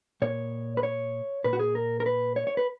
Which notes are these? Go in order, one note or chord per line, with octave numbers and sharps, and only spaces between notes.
A#2 C#5
B4
C#5
A#2 B4
F#4
G#4
A#4
A#4
B4
C#5
C#5
B4